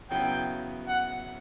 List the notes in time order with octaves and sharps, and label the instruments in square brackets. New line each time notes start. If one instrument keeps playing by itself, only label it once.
[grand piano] C#3 F#3 B3 E4 [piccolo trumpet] G5
[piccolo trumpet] F#5